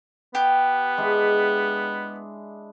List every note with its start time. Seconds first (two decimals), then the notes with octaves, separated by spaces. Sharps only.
0.35 B3 G4
0.98 G#3 D4 E4